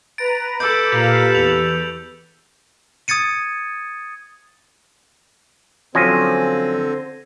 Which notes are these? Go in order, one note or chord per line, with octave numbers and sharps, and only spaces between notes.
B4 A#5 A6 D7
A4 B4 B5 D6 E6 G6
A#2 G4 F5 A#5
E2 F7
D#6 G#6 A6 C#7 D#7
D3 F3 F#3 C4 C#4 G#6 A#6 D#7